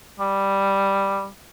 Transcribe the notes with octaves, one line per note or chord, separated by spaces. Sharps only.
G3